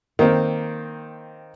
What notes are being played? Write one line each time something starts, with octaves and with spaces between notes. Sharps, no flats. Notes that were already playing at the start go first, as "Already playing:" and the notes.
D#3 A#3 C4 A#4